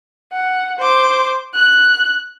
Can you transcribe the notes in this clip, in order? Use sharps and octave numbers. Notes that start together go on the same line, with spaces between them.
F#5
C5 D6
F#6